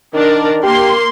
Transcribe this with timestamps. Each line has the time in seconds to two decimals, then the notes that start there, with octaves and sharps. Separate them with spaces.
0.14 D#3 D4 A#4
0.63 A#3 G4 C6